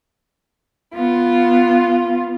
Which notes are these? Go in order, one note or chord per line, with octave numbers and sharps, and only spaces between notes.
B3 F4